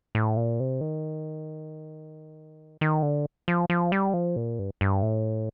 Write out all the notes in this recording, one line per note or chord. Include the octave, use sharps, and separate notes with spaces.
A2
A#2
C3
D#3
D#3
D3
F3
F3
G3
F3
A#2
G2
G2
A2